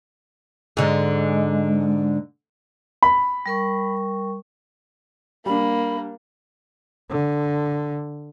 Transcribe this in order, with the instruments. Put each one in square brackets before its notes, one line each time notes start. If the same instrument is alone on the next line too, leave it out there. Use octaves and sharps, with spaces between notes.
[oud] G#2 D3
[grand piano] B5
[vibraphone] G3 A#4 C#6
[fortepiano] G3 D4 [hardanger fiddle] A#3 [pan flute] B5
[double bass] D3